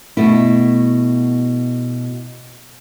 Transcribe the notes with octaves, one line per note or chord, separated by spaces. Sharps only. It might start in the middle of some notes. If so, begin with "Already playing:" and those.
B2 A3 E4